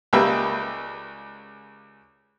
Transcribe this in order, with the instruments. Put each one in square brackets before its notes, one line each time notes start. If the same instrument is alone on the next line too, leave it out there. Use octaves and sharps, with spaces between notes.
[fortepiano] C#2 G3 A#3 B4 E5 G5